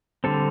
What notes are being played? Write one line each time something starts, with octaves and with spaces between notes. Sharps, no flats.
D3 G3 C4 A4